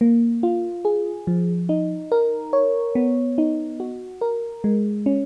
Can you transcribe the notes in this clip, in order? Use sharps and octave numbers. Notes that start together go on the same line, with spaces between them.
A#3
F4
G#4
F3
D#4
A#4
C#5
B3
D#4
F#4
A#4
G#3
C#4